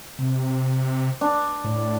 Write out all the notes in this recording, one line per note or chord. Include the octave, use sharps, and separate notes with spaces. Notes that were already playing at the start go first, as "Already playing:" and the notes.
C3
D4
A2